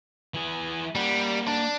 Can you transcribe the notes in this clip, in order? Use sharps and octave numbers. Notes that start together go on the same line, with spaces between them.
E3 G#4
G3 A#3 F#5
D4